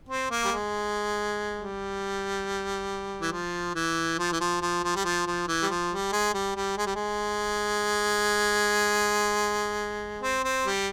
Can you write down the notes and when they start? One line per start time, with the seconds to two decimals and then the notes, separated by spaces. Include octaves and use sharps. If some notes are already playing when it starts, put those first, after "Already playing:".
0.09 C4
0.31 A#3
0.44 G3
0.52 G#3
1.59 G3
3.21 E3
3.32 F3
3.75 E3
4.18 F3
4.32 E3
4.41 F3
4.61 F3
4.84 F3
4.96 G3
5.05 F3
5.27 F3
5.48 E3
5.62 G3
5.69 F3
5.91 G3
6.12 G#3
6.34 G3
6.56 G3
6.78 G#3
6.86 G3
6.95 G#3
10.22 C4
10.44 C4
10.65 G3